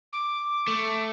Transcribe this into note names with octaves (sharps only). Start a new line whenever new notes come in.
D6
A3